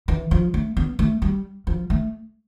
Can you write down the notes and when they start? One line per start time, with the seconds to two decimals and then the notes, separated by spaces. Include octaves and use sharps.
0.08 E3
0.31 F3
0.54 A3
0.77 B3
0.99 A3
1.22 G3
1.67 F3
1.90 A3